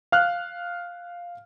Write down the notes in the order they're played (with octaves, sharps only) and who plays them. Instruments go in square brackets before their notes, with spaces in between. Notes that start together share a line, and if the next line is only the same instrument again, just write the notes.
[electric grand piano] F5 F6 F#6